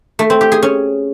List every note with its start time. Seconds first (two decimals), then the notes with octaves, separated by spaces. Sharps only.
0.19 A3
0.30 C4
0.41 G4
0.52 G#4
0.63 C#4